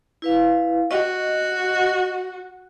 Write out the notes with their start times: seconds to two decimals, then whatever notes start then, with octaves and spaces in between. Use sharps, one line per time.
0.22 E4 B4 F5
0.91 F#4 D#5 C#6